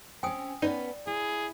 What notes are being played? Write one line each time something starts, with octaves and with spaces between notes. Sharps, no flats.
C4 C#4 G5 G#5 D#6
B3 C#4 D#4 B4 D5
E4 G#4